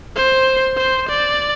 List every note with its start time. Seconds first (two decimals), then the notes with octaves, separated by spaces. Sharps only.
0.16 C5
0.78 C5
1.09 D5